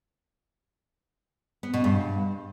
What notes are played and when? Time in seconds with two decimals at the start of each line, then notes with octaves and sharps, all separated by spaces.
1.63 B3
1.74 B2
1.84 G2